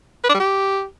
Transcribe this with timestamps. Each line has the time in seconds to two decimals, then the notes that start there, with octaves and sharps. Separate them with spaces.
0.24 B4
0.29 D4
0.35 G3
0.40 G4